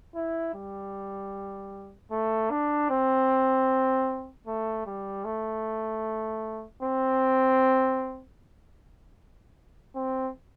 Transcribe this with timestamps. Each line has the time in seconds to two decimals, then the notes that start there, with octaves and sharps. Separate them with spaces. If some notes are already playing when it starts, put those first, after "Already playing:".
0.15 E4
0.55 G3
2.12 A3
2.50 D4
2.90 C4
4.47 A3
4.86 G3
5.25 A3
6.83 C4
9.96 C4